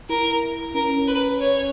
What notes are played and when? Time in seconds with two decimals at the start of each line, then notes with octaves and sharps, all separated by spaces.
0.09 E4 A#4
0.74 C#4 A#4
1.07 B4
1.40 C#5